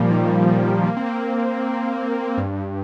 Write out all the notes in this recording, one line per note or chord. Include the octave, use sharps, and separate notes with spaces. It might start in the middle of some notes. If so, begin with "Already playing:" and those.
Already playing: A#2 F3 G3 A#3
D#3
G3
A#3
C4
A#3
G2
G2